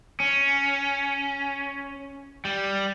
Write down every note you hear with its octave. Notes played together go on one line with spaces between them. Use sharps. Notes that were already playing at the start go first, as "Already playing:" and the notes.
C#4
G3